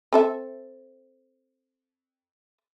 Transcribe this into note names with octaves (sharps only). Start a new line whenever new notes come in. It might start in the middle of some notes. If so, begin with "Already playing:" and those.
C4 A4 E5